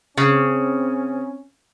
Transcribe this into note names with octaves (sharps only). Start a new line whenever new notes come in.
C#3 C4 C#4